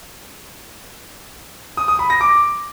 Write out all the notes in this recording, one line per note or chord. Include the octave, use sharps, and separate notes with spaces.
D#6
D#6
B5
A#6
D6